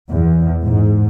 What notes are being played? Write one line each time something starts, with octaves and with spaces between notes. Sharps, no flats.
E2
G#2